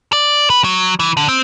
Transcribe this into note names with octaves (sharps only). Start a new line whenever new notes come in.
D5
B4
F#3
E3
D3
C4